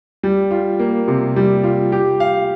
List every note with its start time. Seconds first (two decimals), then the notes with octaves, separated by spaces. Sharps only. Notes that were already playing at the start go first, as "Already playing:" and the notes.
0.23 G3
0.51 F4
0.79 A#3
1.08 C3
1.36 G3
1.63 F4
1.92 G4
2.20 F5